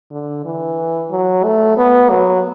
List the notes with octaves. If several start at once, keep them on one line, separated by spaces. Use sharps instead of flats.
D3
E3
F#3
A3
B3
F#3